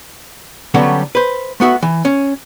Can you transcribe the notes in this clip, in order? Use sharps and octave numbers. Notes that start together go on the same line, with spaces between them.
D3 F#3 G3 B3 C#4 A4
B4 C5
A3 B3 F#4 E5
E3
C#4